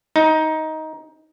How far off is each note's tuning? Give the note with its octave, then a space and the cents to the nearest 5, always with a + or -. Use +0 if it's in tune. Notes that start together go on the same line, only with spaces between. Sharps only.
D#4 +15